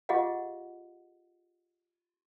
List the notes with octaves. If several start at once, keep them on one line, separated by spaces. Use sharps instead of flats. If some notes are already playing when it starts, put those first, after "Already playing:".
F4 G4 G#4 D#5 F5 F#5